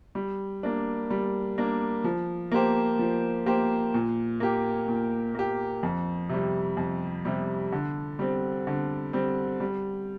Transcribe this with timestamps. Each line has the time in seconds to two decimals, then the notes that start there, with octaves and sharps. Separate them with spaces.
0.15 G3
0.63 A#3 D4
1.10 G3
1.58 A#3 D4
2.04 F3
2.52 A#3 G4 C5
2.99 F3
3.46 A#3 G4 C5
3.94 A#2
4.40 A#3 G4
4.88 A#2
5.35 A#3 G4
5.83 F2
6.29 C3 G3
6.77 F2
7.25 C3 G3
7.72 D3
8.19 G3 C4
8.67 D3
9.13 G3 C4
9.60 G3